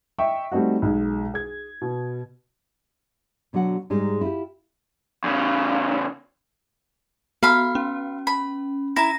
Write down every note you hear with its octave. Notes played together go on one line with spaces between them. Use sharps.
D#5 E5 G5 C#6
G3 A3 C4 D#4 F#4
B1 G#3
G#4 G#6
B2
B2 D3 F#3 F#4 F#5
G#2 G3 G#3 D#4
E4 F4 G4
E2 C#3
B3 F#4 F5 B5
C#4
B5
E4 A#5 A#6